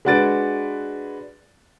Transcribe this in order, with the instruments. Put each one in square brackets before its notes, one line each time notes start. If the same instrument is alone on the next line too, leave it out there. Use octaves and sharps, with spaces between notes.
[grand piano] G#3 D4 F#4 B4 A6 D7